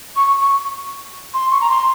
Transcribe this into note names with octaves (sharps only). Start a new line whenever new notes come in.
C#6
C#6
C6
C#6
A#5
C6